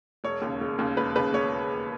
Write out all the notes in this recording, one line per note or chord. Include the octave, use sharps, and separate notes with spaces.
E1 C#5
D#2 C#3
E1
D#2 C#3
E1 B4
D#2 C#3 B4
E1 C#5